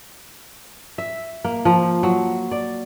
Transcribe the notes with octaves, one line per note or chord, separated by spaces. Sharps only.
E5
A#3
F3
F#3
D5